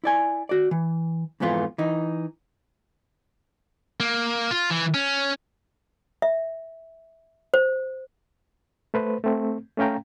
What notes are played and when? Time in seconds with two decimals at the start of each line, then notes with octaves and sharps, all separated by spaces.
0.04 E4 D5 G#5
0.49 F#4 D5
0.71 E3
1.40 F2 G#2 E3 B3 F4
1.78 E3 D#4
4.00 A#3
4.51 F4
4.70 E3
4.94 C#4
6.22 E5
7.54 C5
8.94 A3 B4 C5
9.24 A3 C4
9.78 A3 C#4 F5 G5 A#5